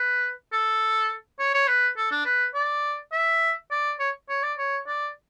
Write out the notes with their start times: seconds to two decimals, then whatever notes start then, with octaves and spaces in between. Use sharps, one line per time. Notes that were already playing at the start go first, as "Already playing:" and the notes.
Already playing: B4
0.53 A4
1.39 C#5
1.54 C#5
1.68 B4
1.97 A4
2.11 D4
2.25 B4
2.54 D5
3.12 E5
3.71 D5
4.00 C#5
4.29 C#5
4.43 D5
4.58 C#5
4.87 D5